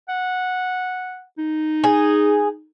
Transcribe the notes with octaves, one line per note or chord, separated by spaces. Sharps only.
F#5
D#4
G#4